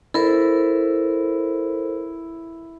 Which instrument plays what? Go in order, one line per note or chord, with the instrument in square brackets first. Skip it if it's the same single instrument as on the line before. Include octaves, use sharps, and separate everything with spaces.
[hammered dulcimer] E4 [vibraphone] A4 A#4 C5